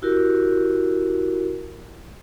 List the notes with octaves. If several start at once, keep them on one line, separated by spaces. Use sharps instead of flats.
E4 F#4 G4 A#4